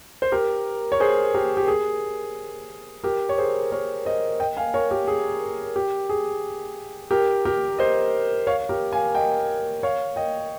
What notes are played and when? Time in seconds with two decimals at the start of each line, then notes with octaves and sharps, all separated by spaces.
0.22 C5
0.32 G4 A#4
0.92 C#5
1.00 G#4 C5
1.34 G4 A#4
1.57 G4
1.68 G#4
3.04 G4 A#4
3.29 C#5
3.38 G#4 C5
3.72 A#4 C#5
4.05 C5 D#5
4.40 D#5 G5
4.57 F5 G#5
4.74 A#4 C#5
4.90 G4 A#4
5.08 G#4
5.76 G4
6.09 G#4
7.11 G4 A#4
7.45 G4 A#4
7.79 C5 D#5
8.47 C#5 F5
8.69 G4 A#4
8.93 F5 G#5
9.15 D#5 G5
9.83 C#5 F5
10.16 D#5 G5